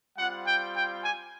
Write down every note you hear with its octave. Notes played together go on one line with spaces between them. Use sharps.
G3 C4 F4 F#5
G5
G5
G#5